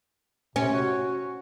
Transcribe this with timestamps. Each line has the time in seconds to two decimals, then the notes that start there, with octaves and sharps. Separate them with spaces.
0.56 C3 C#4
0.73 F#4